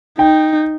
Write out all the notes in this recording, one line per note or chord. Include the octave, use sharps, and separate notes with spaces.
D#4 G5